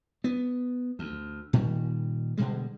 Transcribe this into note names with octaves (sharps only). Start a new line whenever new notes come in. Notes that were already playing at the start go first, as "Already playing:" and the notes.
B3
D2
A#2 D#3 G3
B2 D3 G3 G#3